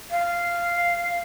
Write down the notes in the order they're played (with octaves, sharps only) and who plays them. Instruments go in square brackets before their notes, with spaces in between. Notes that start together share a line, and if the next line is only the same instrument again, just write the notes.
[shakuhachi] F5